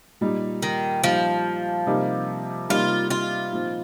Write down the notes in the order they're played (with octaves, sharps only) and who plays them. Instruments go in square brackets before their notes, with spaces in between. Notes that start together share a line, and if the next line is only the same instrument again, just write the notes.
[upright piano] A#2 G3 D#4
[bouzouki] D#3
[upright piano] A#2 G3 D#4 [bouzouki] F3
[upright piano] C3 G3 A#3 D#4
[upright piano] C3 G3 A#3 D#4 [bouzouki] F4
[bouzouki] F4
[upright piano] A#2 F3 C4 D#4